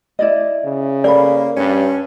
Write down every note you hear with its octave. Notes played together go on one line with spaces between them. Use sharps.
E4 D5 D#5
C#3
A#3 A4 D5 B5
G2 C#4 C#5